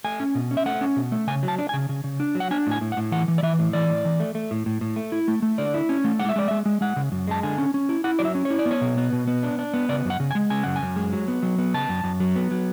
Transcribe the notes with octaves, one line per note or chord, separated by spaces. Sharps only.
A3 G#5
C#4
B2
C#4
E5
A3 F#5
C#4
B2
A3
C#3 G#5
F#3
A5
D4
G#5
C#3
C#3
C#3
D4
F#3
F#5
D4 G#5
A2 G#5
A2
F#5
A2
E3 F#5
E3
D5
E3 E5
A2
E3 D5
A2
E3
A3
A3
A2
A2
A2
A3
E4
A3
A3
D3 D5
E4
C#4
A3
G#3 F#5
E5
G#3 D5
G#3 E5
G#3
G#3 F#5
C#3
F#2
G#3 A5
D3 G#5
C#4
C#4
E4
E4 F#5
F#3 D5
E5
C#4
C#5
E4
D5
B3
C#5
B2
B3
B2
B3
D4
D4
B3
C#3 D5
F#2
F#5
C#3
G#5
G#3
C#3 G#5
F#2 F#5
G#5
F#2
G#3
F#3
B3
F#3
B3
C#3 A5
F#2
F#2
F#3
B3
F#3